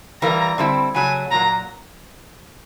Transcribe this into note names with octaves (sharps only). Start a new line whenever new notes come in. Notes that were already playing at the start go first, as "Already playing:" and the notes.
E3 G3 A#3 A#5
D3 G3 C4 E4
C#3 F#3 A3 G#5
A#2 F#3 A#3 A#5